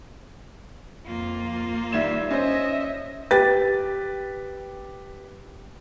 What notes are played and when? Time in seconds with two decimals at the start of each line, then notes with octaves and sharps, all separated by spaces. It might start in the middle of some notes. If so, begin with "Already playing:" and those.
1.06 F2 A#3 F4
1.93 D#3 G3 E5 G#6 E7
2.31 C#4 C5 D#5 E5
3.31 G4 B4 A6